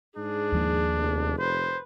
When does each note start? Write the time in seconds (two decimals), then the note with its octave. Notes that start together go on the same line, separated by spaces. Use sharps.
0.17 G#2 D4 G#4
0.52 D#2 F3 A#3
0.96 F1
1.39 B4 C5